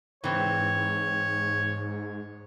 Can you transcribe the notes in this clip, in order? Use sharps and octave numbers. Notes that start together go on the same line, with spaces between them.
G#2 E3 C4 C#5